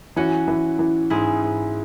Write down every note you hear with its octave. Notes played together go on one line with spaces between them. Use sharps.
E3 C#4 F#4
E3
E3
G#2 E4 G#4
G#2